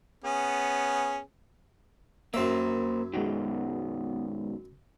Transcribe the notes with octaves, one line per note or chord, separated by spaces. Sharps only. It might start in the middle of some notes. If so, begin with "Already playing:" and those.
B3 C#4 G#4
F#2 A#3 C5 E5
B2 D#3 G#3 B3 F#4